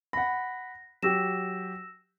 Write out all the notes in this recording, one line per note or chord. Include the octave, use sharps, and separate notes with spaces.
F#5 B5 A#6
F#3 G4 E6 A#6 E7